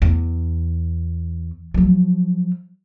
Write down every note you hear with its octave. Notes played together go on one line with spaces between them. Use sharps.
E2
F3 F#3